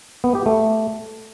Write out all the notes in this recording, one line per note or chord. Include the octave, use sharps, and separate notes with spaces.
B3
G4
A3